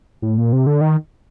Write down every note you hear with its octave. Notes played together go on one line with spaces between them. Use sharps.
A2
A#2
C3
D3
D#3